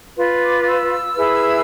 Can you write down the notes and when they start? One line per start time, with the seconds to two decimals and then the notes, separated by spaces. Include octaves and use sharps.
0.17 F4 B4
0.41 D6
0.61 D6
0.66 E6
1.15 E4 G#4 B4